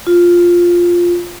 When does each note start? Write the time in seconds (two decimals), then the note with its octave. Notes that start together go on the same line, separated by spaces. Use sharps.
0.07 F4